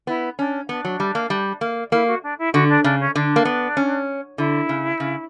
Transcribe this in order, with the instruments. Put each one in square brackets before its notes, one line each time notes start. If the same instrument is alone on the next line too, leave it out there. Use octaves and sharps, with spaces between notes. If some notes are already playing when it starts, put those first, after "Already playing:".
[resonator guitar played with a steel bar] B3 [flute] E4
[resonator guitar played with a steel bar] C#4 [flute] D4
[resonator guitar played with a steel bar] B3 [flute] D4
[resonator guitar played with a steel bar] F#3
G3
A#3
G3
A#3
[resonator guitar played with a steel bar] A#3 [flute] E4
[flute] F#4
D4
E4
[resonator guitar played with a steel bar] D3 [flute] F#4
[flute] D4
[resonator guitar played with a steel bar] C#3 [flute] D4
[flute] C#4
[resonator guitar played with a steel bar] D3 [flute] D4
[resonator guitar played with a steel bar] A#3
B3
C#4
[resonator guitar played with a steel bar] D3 [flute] E4
[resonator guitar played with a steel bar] C#3
C#3